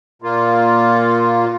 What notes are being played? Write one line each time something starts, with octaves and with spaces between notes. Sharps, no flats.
A#2 A#3 F4